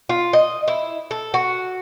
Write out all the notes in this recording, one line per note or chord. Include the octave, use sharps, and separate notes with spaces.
F4
D#5
E4
A4
F#4